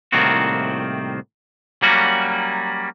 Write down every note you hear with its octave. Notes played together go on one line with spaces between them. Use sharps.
C2 A2 D#3 A#3 C4 F#4
F#3 G3 A#3 C#4 F#4